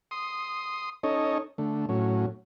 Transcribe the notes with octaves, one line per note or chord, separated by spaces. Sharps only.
C6 D#6
C#4 D#4 A4 C#5 D#5
D3 A3
A2 F#3 C#4